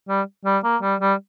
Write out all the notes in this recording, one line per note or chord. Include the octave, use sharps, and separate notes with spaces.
G3
G3
A#3
G3
G3